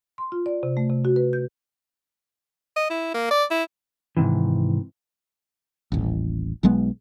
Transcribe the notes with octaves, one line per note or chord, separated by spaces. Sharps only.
C6
F4
D5
C3
A3
C3
F#4
B4
G6
D#5
E4
A#3
D5
E4
G#2 C3 D#3 E3
D#1 A1
B1 F#3 G#3 B3